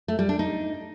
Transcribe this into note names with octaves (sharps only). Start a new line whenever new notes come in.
A3
G3
D4
D#4